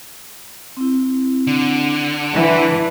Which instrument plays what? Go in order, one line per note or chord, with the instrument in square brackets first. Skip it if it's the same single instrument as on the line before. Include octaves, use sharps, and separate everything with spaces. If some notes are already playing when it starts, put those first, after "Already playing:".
[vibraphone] C4 E4
[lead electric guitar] D3
[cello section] E3 [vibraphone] D5 A5